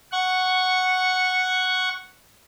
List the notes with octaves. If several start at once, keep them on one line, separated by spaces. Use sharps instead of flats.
F#5 C#6